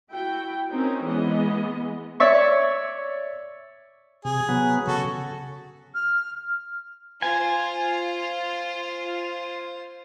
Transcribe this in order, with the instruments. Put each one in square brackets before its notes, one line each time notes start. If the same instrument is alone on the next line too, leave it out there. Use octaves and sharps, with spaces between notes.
[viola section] E4 F#4 G5
C4 C#4 D#4 A#4
E3 G#3 B3 D#5
[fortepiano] C#5 D5 E5 C#6
[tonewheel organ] C3 [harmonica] G#4
[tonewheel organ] F#3 B3
[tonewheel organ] C#3 [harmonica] F#4 A4
[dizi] F6
[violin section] F4 [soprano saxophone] C5 [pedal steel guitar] G#5